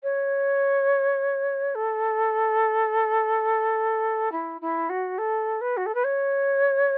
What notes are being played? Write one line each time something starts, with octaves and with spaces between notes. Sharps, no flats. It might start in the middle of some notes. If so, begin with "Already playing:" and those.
C#5
A4
E4
E4
F#4
A4
B4
F#4
A4
B4
C#5